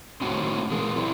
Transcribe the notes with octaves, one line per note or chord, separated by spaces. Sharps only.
A2 C4 C#4 D#4 F#4
E3 G#4 A#4
C4 E4